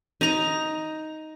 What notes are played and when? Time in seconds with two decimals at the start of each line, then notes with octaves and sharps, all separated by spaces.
0.21 D#4 A#5